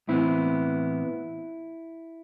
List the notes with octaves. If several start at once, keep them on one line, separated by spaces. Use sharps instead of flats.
A2 E3 B3 C4 E4